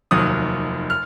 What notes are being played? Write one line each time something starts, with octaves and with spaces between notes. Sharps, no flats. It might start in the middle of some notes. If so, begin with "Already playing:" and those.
F1 D#2 D#3 F#3 D#6
F6